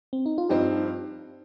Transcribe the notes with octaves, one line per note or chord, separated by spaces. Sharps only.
C4
D#4
F4
G2 F3 C4 D#4 G4